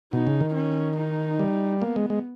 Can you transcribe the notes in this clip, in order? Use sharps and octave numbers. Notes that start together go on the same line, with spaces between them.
B2 D#4
C#3
D#3
C#4
D#4
G3
A#3 B3
G#3
G#3